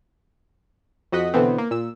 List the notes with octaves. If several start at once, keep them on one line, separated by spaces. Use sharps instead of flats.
F2 F#4 D#5 F#5 B6
B2 D3 E3 B3 C4
A#3
A#2 E6